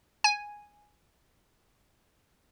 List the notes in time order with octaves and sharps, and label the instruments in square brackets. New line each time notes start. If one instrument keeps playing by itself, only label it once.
[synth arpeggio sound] G#5